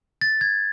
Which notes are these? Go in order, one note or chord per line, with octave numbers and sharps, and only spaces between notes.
A6
G#6